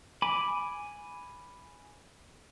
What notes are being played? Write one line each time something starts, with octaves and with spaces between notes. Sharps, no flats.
G#5 B5 D6